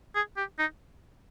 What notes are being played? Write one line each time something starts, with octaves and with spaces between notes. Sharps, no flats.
G#4
G4
D#4